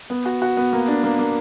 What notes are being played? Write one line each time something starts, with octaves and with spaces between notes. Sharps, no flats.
B3
F#4
F#4
B3
A#3
D4
A#3
A#3